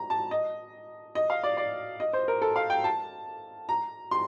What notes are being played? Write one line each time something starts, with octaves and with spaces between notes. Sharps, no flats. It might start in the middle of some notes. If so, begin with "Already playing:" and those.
Already playing: A#5
A5
D#5
D#5
F5
D5
D5
D#5
C5
A#4
A4
F5
G5
A5
A#5
C6